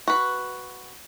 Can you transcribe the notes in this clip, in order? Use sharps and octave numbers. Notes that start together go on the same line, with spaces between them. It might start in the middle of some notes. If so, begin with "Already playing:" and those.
F#4 B4